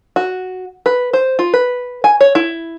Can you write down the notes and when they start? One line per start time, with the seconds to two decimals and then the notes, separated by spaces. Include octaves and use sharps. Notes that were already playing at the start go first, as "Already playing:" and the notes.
0.16 F#4
0.86 B4
1.13 C5
1.39 F4
1.54 B4
2.04 G#5
2.21 C#5
2.35 E4